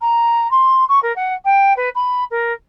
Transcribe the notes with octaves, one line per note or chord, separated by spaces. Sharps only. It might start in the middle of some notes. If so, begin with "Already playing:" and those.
A#5
C6
C#6
A#4
F#5
G5
B4
B5
A#4